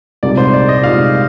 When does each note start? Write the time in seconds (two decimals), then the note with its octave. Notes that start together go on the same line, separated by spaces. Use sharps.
0.23 C2 A#2 G#3 D#4 D5
0.38 C5
0.54 D5
0.69 D#5
0.83 C2 A#2 G#3 D#4 F5